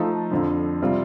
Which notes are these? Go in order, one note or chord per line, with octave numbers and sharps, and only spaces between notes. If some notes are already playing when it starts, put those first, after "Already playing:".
Already playing: F3 A3 D#4 A4
F2 D3 F3
C3 G3 C4 F4